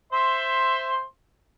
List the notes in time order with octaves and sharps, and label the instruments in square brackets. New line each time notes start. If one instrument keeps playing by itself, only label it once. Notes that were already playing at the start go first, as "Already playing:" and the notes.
[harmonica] C5 E5 C6